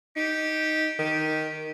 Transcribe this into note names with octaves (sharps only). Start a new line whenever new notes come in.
D#4 G4
D#3 G4